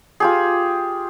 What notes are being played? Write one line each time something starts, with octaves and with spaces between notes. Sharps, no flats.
F4 G4 G#4